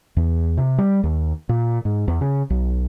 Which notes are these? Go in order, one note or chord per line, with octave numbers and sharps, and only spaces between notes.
E2
C3
G3
D#2
A#2
G#2
E2
C#3
B1